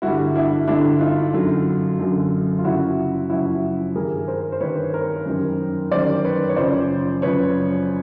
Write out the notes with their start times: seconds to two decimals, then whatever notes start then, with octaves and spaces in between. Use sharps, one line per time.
0.02 G2 D3 G3 E4 F#4
0.36 D4 E4
0.67 G2 D3 G3 D4 E4
1.01 D#4 F4
1.34 F#2 D3 F#3
1.99 F#2 D3 F#3
2.58 F4
2.64 F#2 C#3 F3 E4 F#4
3.29 F#2 C#3 F3 E4 F#4
3.95 G2 D#3 G3 G#4 A#4
4.28 A#4 C5
4.52 C5
4.60 G2 D#3 G3 B4 C#5
4.93 A#4 C5
5.26 F#2 D#3 G3
5.91 F#2 D#3 G3 C5 D5
6.24 B4 C#5
6.49 C#5
6.56 F#2 C#3 F3 C5 D5
7.22 F#2 C#3 F3 B4 C#5